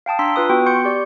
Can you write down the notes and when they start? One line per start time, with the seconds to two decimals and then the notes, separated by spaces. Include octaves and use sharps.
0.06 F5 G5 A5 D#6
0.19 D4 A#5 C6 E6 B6
0.36 F4 B4 D#6
0.50 B3 F#4 G5
0.66 C6 C#6 G6 C#7
0.85 G4 D5